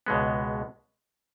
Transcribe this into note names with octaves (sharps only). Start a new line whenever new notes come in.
C#2 B2 G#3 B3